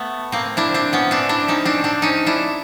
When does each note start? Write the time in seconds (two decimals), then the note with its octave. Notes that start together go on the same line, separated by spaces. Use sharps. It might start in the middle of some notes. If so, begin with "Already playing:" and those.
Already playing: A3 B3
0.32 A#3 C4
0.57 D4 E4
0.74 C4 D4
0.93 B3 C#4
1.11 C4 D4
1.29 D4 E4
1.48 C#4 D#4
1.65 C4 D4
1.84 C4 D4
2.02 C#4 D#4
2.26 D4 E4